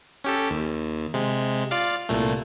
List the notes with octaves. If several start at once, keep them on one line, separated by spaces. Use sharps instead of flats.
C#4 G4 A4
D#2
C3 G#3
F4 D5 F5
C2 A#2 A3